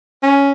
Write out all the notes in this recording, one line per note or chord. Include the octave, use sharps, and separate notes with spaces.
C#4